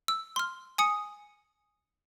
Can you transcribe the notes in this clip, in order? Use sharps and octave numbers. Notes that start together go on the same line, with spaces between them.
E6
C6 F6
G#5 D#6 C#7